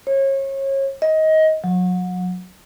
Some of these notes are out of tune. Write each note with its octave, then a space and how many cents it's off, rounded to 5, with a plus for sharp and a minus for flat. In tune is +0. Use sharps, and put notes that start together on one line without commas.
C#5 -30
D#5 +20
F#3 -30